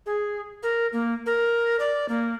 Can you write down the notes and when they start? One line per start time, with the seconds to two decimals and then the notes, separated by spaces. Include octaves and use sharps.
0.06 G#4
0.63 A#4
0.93 A#3
1.26 A#4
1.80 D5
2.09 A#3